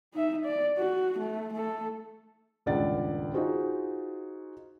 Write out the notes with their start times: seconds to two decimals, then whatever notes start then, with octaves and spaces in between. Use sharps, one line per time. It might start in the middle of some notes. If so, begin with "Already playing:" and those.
0.14 D#4 E5
0.45 D5
0.78 F#4
1.19 A3
1.53 A3 A4
2.66 D#1 C#2 G2 D5 F#5 A6
3.34 D#4 F4 F#4 G#4 C5